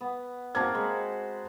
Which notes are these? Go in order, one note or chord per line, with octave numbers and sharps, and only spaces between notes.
B3
A#3 C4 F#4 A5 G#6
G#3 C5 B5